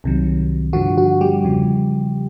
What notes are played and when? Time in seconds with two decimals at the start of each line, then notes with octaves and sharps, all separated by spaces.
0.04 C2 C3 D#3 F#3
0.73 G2 D3 F3 F#4
0.98 F#4
1.21 G3 G4
1.44 E2 C#3 F3